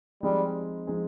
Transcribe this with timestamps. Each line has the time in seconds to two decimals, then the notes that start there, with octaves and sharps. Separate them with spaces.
0.23 F3 G3 G#3 C4 D#4 G#4
0.87 F3 G#3 C4 D#4 G#4